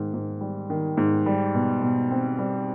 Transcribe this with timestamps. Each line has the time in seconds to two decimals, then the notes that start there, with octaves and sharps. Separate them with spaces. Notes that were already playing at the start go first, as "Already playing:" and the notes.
Already playing: G#2 D#3
0.14 G#2
0.41 G3
0.70 D#3
0.97 G#2
1.26 G3
1.55 B2
1.82 B2
2.11 C4
2.39 G3